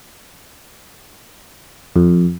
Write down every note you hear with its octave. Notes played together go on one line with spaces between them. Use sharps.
F2